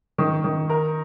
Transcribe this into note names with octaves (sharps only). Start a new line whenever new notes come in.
D#3
D#3
A#4